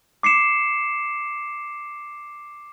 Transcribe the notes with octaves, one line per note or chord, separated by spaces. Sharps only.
D6 C7 C#7 E7